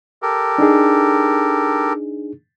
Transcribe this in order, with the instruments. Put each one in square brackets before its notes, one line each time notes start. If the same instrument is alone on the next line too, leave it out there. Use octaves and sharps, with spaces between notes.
[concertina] G4 A4 A#4
[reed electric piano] D4 D#4 G#4